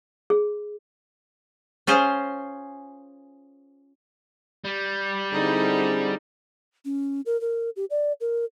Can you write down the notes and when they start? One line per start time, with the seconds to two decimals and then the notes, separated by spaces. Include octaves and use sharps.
0.30 G#4
1.87 C#4 F4 G#4 C5
4.65 G3
5.33 D3 C4 D#4 E4 G#4
6.85 C#4
7.26 A#4
7.41 A#4
7.76 G4
7.90 D5
8.21 A#4